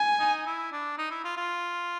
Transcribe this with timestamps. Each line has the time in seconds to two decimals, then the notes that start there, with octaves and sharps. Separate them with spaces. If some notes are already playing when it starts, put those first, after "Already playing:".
Already playing: G#5
0.19 D#4
0.46 E4
0.72 D4
0.98 D#4
1.11 E4
1.25 F4
1.37 F4